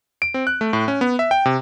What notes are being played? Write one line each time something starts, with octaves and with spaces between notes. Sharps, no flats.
D7
C4
F#6
A3
A2
C#4
B3
E5
G5
C3